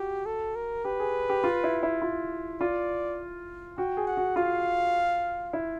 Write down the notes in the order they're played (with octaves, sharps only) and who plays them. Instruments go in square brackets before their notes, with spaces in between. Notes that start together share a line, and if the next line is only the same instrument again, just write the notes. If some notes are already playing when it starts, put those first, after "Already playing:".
Already playing: [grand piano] F#4 [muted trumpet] G4
[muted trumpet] A4
A#4
[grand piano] G4 [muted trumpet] B4
[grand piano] G#4
G4
F4
E4
E4
F4
[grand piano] F4 [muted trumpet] D5
[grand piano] F#4 [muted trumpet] G5
[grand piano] G#4
[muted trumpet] F#5
[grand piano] F#4
[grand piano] F4 [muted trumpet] F5
[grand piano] E4